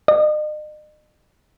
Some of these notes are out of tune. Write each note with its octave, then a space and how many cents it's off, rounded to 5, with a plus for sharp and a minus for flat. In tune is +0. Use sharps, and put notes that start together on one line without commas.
D#5 -40